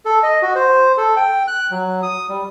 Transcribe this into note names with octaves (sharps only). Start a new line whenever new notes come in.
A4
D#5
F#4
C5
A4
G5
F#6
F#3
D#6
G3